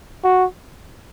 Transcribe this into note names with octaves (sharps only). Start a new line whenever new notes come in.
F#4